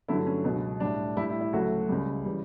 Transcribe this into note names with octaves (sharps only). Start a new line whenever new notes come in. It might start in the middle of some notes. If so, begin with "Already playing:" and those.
G2 D3 F#3 A3 E4
C#4
C#2 B2 F#3
A2 G3 D4
A2 G3 E4
E4
E4
D2 C#3 F#3 A3 F#4
C#2 C#3 G3
C#3 E3 G3